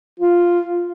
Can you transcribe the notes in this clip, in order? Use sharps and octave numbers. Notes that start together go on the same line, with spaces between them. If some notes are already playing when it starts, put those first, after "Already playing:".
F4